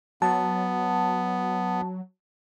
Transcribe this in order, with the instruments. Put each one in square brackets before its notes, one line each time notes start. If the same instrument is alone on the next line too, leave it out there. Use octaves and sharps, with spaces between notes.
[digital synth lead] F#3 [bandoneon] B3 [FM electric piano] A5